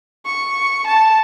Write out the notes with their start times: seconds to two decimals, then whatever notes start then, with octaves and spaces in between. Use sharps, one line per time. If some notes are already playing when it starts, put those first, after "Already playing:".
0.26 C#6
0.87 A5